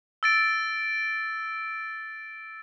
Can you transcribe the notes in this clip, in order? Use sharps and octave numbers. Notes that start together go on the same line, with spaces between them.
E6 A6 D7